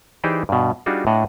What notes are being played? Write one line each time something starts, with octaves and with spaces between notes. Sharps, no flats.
E3 D#4 G4 G#4 C5 D5
G2 B2
G3 D4 D#4 F4 F#4 G#4
A2 D4 D#5 F#5